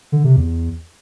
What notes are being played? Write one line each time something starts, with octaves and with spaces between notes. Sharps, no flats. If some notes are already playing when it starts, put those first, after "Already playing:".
D3
C3
E2